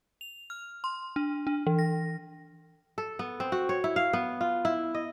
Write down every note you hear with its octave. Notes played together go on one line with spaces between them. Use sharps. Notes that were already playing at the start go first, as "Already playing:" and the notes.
F7
F6
C6
D4
D4
E3
A#6
A4
B3
C4
F#4
C#5
E4
F5
B3
F4
E4
D#5